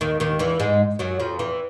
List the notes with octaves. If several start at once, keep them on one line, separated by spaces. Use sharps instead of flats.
D#2 D#3
D#2 D#3
E2 E3
G#2 G#3
F#2 F#3
F2 F3
E2 E3